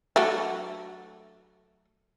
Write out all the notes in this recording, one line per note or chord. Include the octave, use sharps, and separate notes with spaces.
F#3 A3 D4